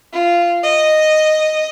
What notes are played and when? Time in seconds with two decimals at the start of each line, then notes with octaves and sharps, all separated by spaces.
0.13 F4
0.63 D#5